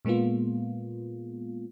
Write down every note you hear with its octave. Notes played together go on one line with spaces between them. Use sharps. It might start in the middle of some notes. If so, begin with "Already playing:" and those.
A#2 G#3 A#3 B3 F4